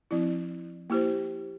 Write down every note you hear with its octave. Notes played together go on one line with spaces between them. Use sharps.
F3 C4 E4
A#3 E4 G4 C5